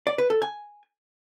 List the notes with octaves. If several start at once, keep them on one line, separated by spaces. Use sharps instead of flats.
D5
B4
A4
G#5